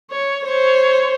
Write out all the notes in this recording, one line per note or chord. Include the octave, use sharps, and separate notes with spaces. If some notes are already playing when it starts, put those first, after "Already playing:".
C#5
C5 C#5